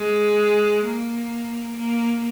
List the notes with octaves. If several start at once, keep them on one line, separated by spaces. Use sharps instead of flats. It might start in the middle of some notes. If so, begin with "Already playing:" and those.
Already playing: G#3
A#3
A#3